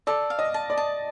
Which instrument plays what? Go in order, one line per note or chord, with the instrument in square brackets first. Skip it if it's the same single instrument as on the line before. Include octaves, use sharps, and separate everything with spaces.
[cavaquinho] A4 [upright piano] D5
[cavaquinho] F5
[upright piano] D#5
[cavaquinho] A5
[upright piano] D5
[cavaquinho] A5